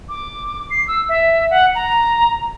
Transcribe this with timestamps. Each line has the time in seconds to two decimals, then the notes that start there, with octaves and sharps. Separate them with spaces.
0.09 D6
0.70 C7
0.88 E6
1.09 E5
1.50 F#5
1.75 A#5